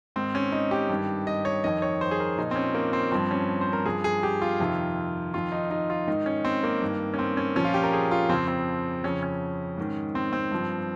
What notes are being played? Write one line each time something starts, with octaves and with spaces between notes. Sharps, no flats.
G#2 D#3 C4
C#4
D#4
G4
G2 D#3
D#5
C#5
F2 D#3 D#5
C#5
C5
G#4
A#4
A#2 F3 D#4
C4
C#4
A#3
C4
G2 F3 C4
C#4
C5
A#4
G2 F3 G#4
G#4
G4
F4
F2 C3 D#3
F2 D#3 F4
D#4
D#4
F4
G#2 D#3 D#4
C#4
C4
A#3
G2 D#3
C#4
C4
C#4
A#2 F3 C#4
F4
G4
A#4
G#4
F4
F2 C#3 F3 C4
C4
F2 C#3 F3 C#4
C#4
G#2 D#3
C4
C4
G2 F3